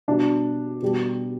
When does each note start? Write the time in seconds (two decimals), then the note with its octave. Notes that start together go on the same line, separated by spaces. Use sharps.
0.08 B2 G3 D4
0.82 B2 G3